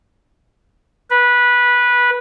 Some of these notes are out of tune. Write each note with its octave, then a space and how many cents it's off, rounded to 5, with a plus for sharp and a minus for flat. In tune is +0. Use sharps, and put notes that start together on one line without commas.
B4 -15